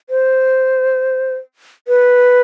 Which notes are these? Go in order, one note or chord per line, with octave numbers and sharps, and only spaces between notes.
C5
B4